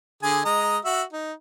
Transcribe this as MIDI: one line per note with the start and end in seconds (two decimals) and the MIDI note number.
0.23 0.40 50
0.23 0.40 68
0.23 0.40 80
0.45 0.78 56
0.45 0.78 75
0.45 0.78 82
0.85 1.03 66
0.85 1.03 76
1.13 1.33 63